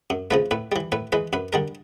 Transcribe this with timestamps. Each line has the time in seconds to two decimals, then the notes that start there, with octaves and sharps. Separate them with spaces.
0.10 F#2
0.31 C#3 F3 A3 B4
0.51 A2 B4
0.72 E3 G3
0.92 A2 B4
1.12 E3 G#3 B4
1.33 F#2 B4
1.53 D3 G3 A#4